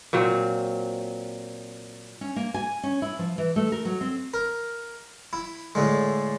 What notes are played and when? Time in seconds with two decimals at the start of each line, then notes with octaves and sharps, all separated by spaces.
0.13 A#2 F#3 C4
2.21 C#4
2.36 A#3
2.54 G#5
2.83 C#4
3.02 E4
3.19 F3
3.38 E3
3.56 A3
3.72 A#4
3.85 F#3
4.01 C4
4.34 A#4
5.33 E4
5.75 A2 D3 G#3